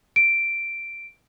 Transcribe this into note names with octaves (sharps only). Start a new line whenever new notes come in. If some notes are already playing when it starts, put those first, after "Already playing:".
D7